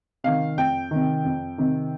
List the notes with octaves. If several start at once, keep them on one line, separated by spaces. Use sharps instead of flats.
C3 D#3 F5
F2 G5
C3 D#3
F2
C3 D#3